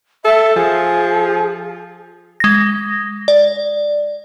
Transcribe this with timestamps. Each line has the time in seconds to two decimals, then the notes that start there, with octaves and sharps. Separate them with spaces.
0.25 A4 E5
0.56 F3 G#4
2.40 G#3 A#6
3.28 D5